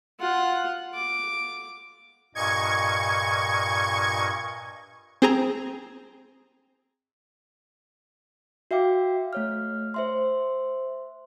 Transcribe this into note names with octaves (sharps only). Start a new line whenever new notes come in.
F4 F#5
D6
G2 A#2 D#5 C#6 G#6
C4 G#4 A#5
F#4 E5 F5 G5 D6
A3 C#5 F6
C5 E5 C6